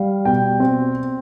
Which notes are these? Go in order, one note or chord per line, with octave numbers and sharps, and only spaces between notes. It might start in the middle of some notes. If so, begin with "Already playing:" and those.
Already playing: G3 F5
B2 G5
C4